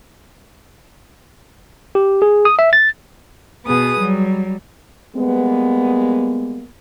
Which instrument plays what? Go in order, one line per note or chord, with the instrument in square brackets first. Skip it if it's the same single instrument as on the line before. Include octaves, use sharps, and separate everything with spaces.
[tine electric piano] G4
G#4
D#6
E5
A6
[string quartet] B2 B3 G#4 B4 D#6
F#3 G3
[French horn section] G3 G#3 A#3 B3